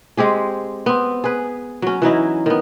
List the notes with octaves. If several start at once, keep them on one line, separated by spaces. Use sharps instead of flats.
G#3 C4 G4 G#4
B3 C4
G#4 B4
F#3 C#4
E3 F#3 D#4 E4
D#3 B3